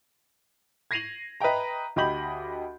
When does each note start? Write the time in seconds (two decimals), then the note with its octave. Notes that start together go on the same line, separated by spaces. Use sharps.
0.91 G#6 A#6 C7 D#7 F7 F#7
1.40 B4 D#5 E5 G5 A#5
1.96 D2 G4 D#5 B5 G6 F#7